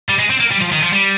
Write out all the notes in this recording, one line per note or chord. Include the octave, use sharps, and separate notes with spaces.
G3
G#3
C4
A#3
G3
F3
D#3
F3
G3